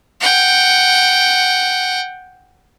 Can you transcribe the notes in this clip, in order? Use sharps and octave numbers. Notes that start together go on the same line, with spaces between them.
F#5 G5